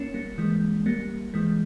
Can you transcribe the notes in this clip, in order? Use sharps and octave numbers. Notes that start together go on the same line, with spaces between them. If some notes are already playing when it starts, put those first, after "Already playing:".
Already playing: A#3 C#4
G3 A#3
E3 G#3
G3 A#3
E3 G#3